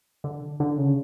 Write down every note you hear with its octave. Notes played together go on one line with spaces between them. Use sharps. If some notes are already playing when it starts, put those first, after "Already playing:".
D3
D3
C#3